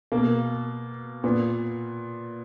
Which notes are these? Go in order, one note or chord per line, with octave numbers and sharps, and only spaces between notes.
B2 A#3
A#2 B3